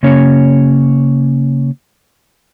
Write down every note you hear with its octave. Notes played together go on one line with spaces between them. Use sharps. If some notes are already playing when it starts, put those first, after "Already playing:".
C#3 A#3 C#4 C#5